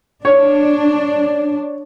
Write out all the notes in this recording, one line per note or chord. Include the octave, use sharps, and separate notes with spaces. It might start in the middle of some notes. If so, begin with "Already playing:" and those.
D4 C#5